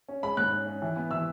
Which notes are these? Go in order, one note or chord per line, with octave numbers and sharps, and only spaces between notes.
C#4
G#3 B5
G#2 F#6
C#4
C#4
E3
B3
E3 E6